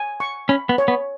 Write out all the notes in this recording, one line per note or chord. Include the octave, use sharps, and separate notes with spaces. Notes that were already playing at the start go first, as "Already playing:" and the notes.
Already playing: G#5
C#6
C#4 B5
B3
C#5
B3